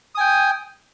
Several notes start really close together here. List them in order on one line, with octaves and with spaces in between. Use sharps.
D#6 G#5 G5